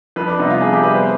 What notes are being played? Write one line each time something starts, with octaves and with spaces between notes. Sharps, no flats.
F2 B4
D4
C3 G3 B3 D#4
F4
F2 G#4
G4
C3 G3 B3 B4
C5